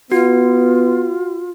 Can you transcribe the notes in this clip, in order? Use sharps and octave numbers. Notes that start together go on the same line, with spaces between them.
B3 F4 F#4